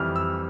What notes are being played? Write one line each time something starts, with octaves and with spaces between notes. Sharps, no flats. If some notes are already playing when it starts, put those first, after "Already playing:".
Already playing: F2 E3 G3 F6
E6